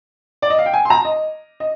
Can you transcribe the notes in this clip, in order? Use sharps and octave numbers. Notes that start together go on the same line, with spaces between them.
D5
D#5
F5
G5
G#5
C6
A#5
D#5
D#5